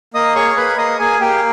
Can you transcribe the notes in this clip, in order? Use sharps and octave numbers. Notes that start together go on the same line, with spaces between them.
A#3 D#5 D#6
G#4 C#5 C#6
A#3 B4 B5
A#3 D#5 D#6
A#3 G#4 G#5
A#3 G4 G5